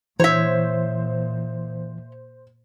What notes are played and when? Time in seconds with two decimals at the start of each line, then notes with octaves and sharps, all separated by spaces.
0.20 A#2 E3 C5 C#5 E5